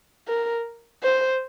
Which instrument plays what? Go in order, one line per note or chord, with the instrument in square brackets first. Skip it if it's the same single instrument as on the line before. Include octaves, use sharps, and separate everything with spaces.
[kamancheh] A#4
C5